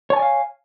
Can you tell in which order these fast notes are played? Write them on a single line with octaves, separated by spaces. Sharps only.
C#5 A5 G#5 D5 F5